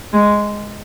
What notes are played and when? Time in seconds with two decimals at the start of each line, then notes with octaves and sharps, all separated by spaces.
0.13 G#3